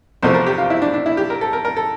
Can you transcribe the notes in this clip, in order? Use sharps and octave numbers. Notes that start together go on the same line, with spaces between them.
E2 C3 F3 A3 C5
A#4
G4
F4
E4
D4
D4
E4
G4
A#4
A4
A#4
A#4
A4